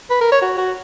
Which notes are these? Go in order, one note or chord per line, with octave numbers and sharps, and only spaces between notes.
B4
A#4
C#5
F#4
F#4